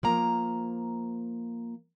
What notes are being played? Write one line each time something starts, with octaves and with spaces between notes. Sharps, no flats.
F3 A#3 A#5